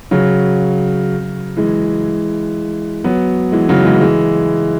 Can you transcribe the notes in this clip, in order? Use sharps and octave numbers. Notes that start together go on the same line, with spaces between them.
C#3 F#3
E3 G#3
F#3 B3
E3 G#3
C#3 F#3
E3 G#3
E3 G#3